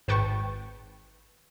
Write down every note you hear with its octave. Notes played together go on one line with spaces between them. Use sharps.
G#1 B4 G5 A5 C#6